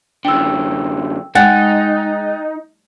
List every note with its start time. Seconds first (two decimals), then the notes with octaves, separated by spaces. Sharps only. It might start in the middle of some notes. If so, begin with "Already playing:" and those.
0.25 F#2 D3 G5 E6
1.35 G#3 D#4 F#5 G5 F#6 A6